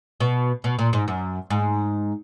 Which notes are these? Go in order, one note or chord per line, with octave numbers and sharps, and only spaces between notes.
B2
B2
A#2
G#2
F#2
G#2